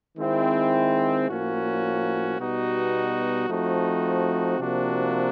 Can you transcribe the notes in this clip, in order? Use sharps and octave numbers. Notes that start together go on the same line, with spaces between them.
D#3 G#3 C4 E4
A2 F3 A#3 C#4 F#4
B2 G3 B3 D#4 F#4
F3 A3 C4 D#4 F#4
C3 F3 A#3 D4 F#4